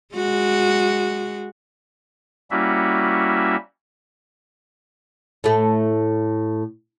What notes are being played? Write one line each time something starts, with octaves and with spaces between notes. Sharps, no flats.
G#3 F#4
G3 A#3 C#4 E4 F#4 E5
A2 A3